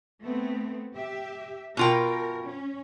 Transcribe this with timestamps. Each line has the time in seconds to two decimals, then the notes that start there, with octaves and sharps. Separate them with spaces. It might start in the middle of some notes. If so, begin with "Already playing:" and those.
0.22 A3 B3 C4
0.96 G4 E5
1.77 B2 F4 A#4 G5
2.44 C#4